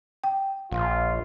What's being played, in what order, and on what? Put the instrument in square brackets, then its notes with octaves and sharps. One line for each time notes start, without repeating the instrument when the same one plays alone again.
[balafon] G5
[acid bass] A#1 [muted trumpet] F4